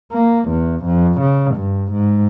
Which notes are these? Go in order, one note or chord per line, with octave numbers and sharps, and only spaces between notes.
A#3
E2
F2
C#3
G2
G#2